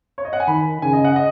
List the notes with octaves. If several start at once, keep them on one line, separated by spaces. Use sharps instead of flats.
C#5
D#5
F#5
G#5
D#3 B5
C#3 G#5
D#5
F#5
D#5